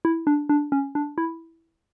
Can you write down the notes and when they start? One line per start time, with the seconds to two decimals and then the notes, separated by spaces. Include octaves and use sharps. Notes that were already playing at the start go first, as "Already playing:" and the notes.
0.05 E4
0.27 D4
0.49 D4
0.72 C#4
0.95 D4
1.18 E4